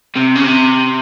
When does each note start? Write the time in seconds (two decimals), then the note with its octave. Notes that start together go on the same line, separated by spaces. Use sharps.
0.16 C3
0.36 C#3
0.44 C3